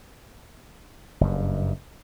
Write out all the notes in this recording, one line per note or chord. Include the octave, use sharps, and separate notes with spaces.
F#1 G2